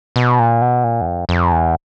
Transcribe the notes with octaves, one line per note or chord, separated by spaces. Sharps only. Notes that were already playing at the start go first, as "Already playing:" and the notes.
B2
A#2
B2
A#2
E2
F2
F2
E2